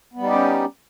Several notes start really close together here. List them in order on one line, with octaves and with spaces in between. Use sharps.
B3 G3 D#4 G4 C#4